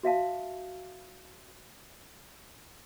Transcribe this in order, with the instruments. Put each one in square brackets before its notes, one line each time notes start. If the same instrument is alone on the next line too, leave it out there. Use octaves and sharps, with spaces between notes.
[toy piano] F#4 E5 F5 A5